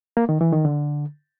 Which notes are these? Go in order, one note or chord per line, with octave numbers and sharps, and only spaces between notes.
A#3
D#3
E3
D#3
D3